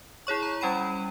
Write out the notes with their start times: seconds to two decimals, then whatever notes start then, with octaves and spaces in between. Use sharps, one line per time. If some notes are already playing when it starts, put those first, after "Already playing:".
0.27 E4 G#4 C#5 C#6
0.43 A#5
0.61 G3 C#4 G5 B5 D#7